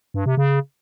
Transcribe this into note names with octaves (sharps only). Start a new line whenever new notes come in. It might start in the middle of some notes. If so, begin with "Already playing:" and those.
G2
C3
C#3